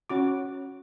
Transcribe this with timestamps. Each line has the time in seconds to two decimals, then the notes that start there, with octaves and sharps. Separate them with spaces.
0.10 C#4 F#4 D6